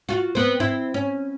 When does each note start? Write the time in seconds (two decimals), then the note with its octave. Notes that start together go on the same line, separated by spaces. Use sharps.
0.09 F4 F#4
0.35 B3 C4
0.60 C4 E4
0.94 C#4